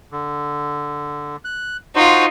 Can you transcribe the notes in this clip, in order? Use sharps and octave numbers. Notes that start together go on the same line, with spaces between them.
D3
F#6
D#4 F4 F#4 C5